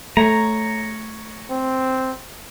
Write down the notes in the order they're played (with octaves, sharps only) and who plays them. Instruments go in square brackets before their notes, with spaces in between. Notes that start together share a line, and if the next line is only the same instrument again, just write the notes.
[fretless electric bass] A3 [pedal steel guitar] C#5 A#5
[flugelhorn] C4